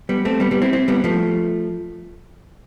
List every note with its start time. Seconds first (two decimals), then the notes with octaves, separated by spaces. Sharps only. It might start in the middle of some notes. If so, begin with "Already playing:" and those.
0.09 G3 B3
0.25 A3 C4
0.40 G3 B3
0.51 G3 B3
0.62 C4 E4
0.73 C4 E4
0.88 G3 B3
1.04 F3 A3